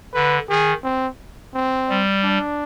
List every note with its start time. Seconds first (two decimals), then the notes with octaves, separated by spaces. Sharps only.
0.14 D3 B4
0.49 D#3 G#4
0.83 C4
1.54 C4
1.89 G3
2.23 D4